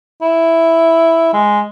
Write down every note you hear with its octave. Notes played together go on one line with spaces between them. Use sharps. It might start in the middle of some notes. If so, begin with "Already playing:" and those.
E4
G#3